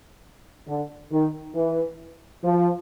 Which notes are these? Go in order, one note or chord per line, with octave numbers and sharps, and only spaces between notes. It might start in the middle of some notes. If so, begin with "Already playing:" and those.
D3
D#3
E3
F3